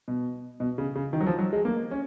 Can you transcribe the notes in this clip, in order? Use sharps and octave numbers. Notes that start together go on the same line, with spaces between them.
B2
B2
C#3
C#3
D#3
F#3
F3
F#3
G#3
A#3
C#4